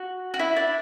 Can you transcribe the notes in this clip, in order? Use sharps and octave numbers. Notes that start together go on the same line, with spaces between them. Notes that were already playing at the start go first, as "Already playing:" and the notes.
Already playing: F#4
F#4
E4
D4